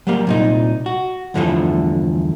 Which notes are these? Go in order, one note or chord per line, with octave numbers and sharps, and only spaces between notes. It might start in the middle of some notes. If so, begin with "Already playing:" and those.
F#3 G3 A#3
C2 A#2 D#4
F#4
E2 G2 D3 E3 F3 A3